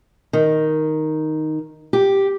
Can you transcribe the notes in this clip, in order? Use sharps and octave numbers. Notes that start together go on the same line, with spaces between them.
D#3
G4